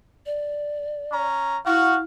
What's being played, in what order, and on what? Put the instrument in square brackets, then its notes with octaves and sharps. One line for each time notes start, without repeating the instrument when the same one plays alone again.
[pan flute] D5
[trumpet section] C#4 A#5
[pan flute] E4 [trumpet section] F#4 [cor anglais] F5